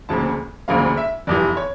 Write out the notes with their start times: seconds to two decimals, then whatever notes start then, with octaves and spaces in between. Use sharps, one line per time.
0.09 E1 D2 C#3 F3 A#3 A5
0.68 E1 D2 C#3 F3 A#3 F5
0.97 E5
1.27 F1 E2 E3 G3 D5
1.57 C#5